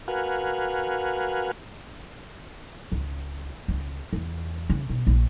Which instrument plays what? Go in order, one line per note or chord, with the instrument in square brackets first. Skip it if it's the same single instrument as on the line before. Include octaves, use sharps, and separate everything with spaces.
[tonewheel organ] F#4 A#4 B4 F5 F#5 G#5
[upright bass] C#2
C#2
E2
C#3
B2
A#1